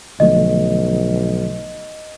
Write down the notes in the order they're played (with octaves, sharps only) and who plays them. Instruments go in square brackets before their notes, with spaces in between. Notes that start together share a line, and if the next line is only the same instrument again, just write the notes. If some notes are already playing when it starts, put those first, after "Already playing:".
[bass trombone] B1 [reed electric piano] D3 F3 A3 [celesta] D#5